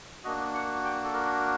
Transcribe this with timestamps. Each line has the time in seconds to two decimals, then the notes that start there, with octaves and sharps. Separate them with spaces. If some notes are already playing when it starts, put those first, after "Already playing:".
0.24 A#3 D4 F#4 D#5
0.54 F#5
0.84 G5
1.04 A4
1.14 A#4